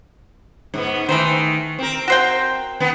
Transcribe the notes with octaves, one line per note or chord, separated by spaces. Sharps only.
G#2 B3
D#3 E3 A3 C5
C4 A#4
F#4 C5 G5
D#3 B3